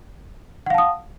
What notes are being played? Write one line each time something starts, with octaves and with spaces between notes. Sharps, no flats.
F5 F#5 A5 D#6